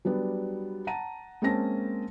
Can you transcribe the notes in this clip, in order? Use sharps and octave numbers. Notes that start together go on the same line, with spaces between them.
F#3 G3 B3 D4
F#5 A5 A#5 D#7
G#3 A#3 C4 C#4 A5 A#6